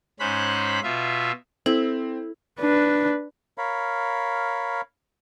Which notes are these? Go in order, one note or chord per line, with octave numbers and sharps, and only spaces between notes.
G#2 C#4 C5 B5 F#6
B2 F4 E5
C4 E4 A4
D4 B4
A#4 C#5 F5 B5